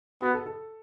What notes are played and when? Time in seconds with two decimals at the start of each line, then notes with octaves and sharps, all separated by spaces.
0.22 B3 F#4
0.34 A4
0.46 A4